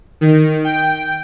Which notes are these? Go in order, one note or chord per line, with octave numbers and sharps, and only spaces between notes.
D#3
G5